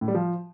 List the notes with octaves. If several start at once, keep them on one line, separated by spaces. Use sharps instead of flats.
A2
G3
F3